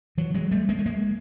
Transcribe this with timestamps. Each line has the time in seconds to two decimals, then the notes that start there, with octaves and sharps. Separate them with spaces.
0.18 E3 F#3
0.34 F#3 G#3
0.51 G3 A3
0.69 G#3 A#3
0.79 A3
0.86 G#3 A#3